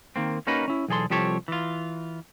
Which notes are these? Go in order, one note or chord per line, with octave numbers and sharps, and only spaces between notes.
D#3 A#3 C4
A#3 C#4 D#4 F#4 A#4 B4
C#4 E4
B1 E2 G#4 A4 C6
C2 F3 G4 A4 C#5
E3 F4